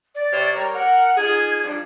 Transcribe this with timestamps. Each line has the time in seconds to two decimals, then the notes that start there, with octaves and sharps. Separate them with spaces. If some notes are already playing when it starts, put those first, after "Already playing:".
0.15 D5
0.32 C3 C5 C#5
0.55 G3 A#4 C#5 A#5
0.74 A#4 F#5
1.17 D#4 F4 G#4 G#6
1.64 F3 G3 D4